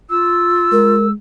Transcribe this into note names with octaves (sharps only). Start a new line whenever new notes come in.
F4 E6
G#3 A#4